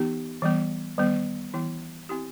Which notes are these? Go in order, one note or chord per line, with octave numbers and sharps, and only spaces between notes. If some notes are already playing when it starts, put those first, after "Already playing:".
Already playing: E3 B3 D#4 G4
E3 G3 B3
D#3 G3 B3
E3 B3 E4
C4 E4 G4